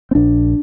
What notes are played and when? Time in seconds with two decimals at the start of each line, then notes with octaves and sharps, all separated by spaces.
0.11 C4
0.15 A#1 D4